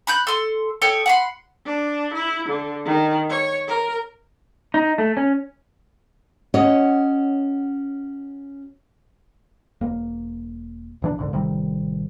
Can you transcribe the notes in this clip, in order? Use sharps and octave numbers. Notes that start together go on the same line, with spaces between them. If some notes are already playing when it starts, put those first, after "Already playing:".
B5 F#6 G6
A4 C6
A4 C#5 D#5 G5
F#5 B5 C6
D4
E4
D3
D#3
C#5
A#4
D#4
A3
C#4
C#4 F#4 C#5 D#5
E1 A#3
D#1 E3 D4
E1 C2 G#2 D3
A1 C3 D#3 G3